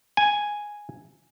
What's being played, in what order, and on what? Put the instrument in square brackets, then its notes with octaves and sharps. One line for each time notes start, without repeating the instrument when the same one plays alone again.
[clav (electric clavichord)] G#5